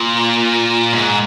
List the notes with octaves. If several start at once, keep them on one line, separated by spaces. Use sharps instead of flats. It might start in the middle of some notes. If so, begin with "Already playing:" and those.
Already playing: A#2
G#2